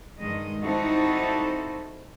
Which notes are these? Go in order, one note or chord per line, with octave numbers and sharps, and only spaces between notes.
G2 D#3 G#3 D#5
G3 C4 D#4 E4 F#4 A4